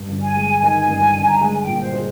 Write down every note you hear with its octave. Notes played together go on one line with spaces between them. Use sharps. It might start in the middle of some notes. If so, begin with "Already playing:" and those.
Already playing: G2
G1
G#5
G#3
D#3 G#5
G2
G1
A#5
G#3 G#5
G#5
G5
A#2
C5
G#4